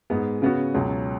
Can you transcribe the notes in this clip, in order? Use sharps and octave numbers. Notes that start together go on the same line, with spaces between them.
G#2 G#3 B3
C#3 B3 F#4
C#2 B2 F#3